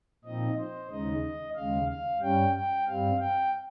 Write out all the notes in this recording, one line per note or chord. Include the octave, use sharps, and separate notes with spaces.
A#2 F3 C4 D#4 D#5
C5
D#2 C#3 G#3 D#4 D#5
D#2 C#3 G#3 F5
F5
G2 G3 C#4 G5
G5
G2 G3 C4 F5
G5